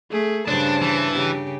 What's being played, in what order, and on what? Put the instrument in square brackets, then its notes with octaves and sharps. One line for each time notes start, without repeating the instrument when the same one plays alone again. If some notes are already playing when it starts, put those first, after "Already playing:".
[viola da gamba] A3 [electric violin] G#4
[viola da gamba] G2 C#3 C5 [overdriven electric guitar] D4 [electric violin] A5
[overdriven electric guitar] E3
[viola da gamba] C#3 G4